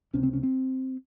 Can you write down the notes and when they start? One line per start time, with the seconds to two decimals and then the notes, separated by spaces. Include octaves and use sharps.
0.13 C#2 C3 C#4
0.23 C4
0.33 C#4
0.43 C4